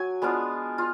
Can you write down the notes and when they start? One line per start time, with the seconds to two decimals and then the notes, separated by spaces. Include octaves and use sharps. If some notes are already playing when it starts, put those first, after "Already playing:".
Already playing: F#3 G#5
0.22 G#3 B3 D4 F4
0.78 F4